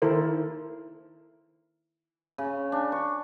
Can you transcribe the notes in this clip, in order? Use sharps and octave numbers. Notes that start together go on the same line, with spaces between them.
D#3 E4 A4 A#4 C5
C#3
D4
C#6